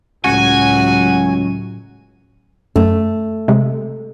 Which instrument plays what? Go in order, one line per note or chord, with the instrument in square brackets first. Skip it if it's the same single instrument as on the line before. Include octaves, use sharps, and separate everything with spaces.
[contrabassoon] C#2 [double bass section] A2 F#3 [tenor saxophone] F#4 [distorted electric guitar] G#5
[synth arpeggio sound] F#2 [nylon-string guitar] A3
[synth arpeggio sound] C3 G#3